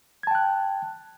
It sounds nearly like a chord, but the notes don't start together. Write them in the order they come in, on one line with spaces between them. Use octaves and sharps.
G#6 A5 G5 F#6